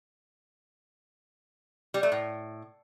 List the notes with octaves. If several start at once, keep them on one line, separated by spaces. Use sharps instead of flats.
G3
A3
A2